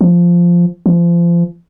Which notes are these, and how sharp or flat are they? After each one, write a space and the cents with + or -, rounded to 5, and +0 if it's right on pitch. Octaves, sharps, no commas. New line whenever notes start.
F3 -5
F3 -30